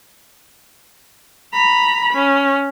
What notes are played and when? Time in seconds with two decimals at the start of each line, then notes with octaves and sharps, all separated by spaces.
1.53 A#5 B5
2.13 C#4